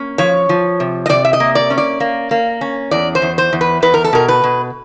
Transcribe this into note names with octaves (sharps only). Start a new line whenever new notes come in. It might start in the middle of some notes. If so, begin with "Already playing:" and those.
Already playing: A#3 C#4
F3 C#5
F3
C3
D#5
C3 D5
E5
D#5
A#3
D5
C#4
D5
A#3
A#3
C#4
E2 D5
C5
E2
C5
E2
B4
E2 B4
A#4
A4
B2 A#4
B4
B2